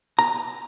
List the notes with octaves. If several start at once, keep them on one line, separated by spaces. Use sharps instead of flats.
A#5